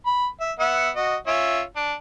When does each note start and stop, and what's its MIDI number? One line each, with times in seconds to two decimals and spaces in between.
0.06 0.27 83
0.41 0.52 76
0.60 0.90 59
0.60 0.90 76
0.60 0.90 78
0.96 1.16 66
0.96 1.16 75
1.27 1.62 61
1.27 1.62 65
1.27 1.62 76
1.76 1.94 62